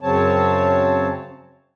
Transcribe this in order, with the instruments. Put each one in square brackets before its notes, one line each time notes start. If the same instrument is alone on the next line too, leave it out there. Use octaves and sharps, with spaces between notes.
[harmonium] F#2 C#3 F#3 C4 C#5 A5